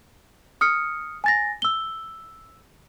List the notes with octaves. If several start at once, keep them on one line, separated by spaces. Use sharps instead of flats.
D#6 F6 C#7
G#5 A6 A#6
E6 G7